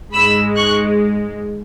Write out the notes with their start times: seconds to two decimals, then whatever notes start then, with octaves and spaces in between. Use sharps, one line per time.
0.13 G#2 G#3 B5 E6
0.55 C#6 F#6